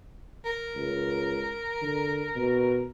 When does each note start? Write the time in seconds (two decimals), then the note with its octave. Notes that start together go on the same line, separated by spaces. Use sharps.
0.45 A#4
0.75 C#2
1.82 D3
2.36 B2